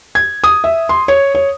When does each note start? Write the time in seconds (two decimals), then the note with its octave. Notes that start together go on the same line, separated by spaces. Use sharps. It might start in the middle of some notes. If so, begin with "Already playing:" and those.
0.15 G#6
0.44 D#6
0.64 E5
0.89 C6
1.08 C#5
1.35 C#5